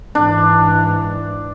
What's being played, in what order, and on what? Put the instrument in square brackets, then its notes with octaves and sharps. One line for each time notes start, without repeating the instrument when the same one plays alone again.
[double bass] G#2 E3 [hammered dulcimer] D4